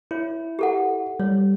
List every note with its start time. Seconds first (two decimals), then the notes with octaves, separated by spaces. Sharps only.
0.11 E4 C#5
0.59 G4 A4 F#5
1.20 G3 C#5